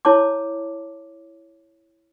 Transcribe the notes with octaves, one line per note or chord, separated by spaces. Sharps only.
E4 C#5 A5 D6